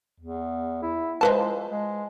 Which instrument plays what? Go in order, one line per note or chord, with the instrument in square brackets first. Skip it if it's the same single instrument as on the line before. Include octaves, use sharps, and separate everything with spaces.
[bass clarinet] E2
E4
[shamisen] F3 B4 A5 [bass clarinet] G#3
[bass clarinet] G#3